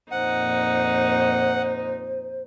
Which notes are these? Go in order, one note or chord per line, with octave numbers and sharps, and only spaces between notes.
F2 A#2 D#4 C5 F#5